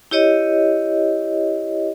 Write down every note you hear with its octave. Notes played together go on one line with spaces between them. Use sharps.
E4 G4 C#5 D#5